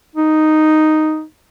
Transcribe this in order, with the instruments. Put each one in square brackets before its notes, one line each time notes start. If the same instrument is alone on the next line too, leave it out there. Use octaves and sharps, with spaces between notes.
[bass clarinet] D#4